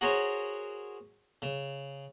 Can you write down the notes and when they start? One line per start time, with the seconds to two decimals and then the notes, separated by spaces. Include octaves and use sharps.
0.01 F#4 G#4 A#4 C5 C#5
1.42 C#3